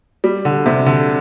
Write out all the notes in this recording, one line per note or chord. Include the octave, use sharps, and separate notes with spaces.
G3
D3
C3
D3